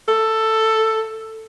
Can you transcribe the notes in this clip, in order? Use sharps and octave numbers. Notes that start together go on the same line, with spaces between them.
A4